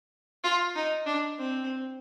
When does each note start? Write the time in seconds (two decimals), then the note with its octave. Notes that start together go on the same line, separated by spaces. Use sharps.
0.44 F4
0.75 D#4
1.06 D4
1.38 C4